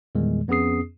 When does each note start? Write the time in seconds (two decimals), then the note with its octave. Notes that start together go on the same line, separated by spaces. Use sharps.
0.15 E2 A#2 D#3 G3 G#3
0.48 F2 B3 C#4 G#4 D#6 C7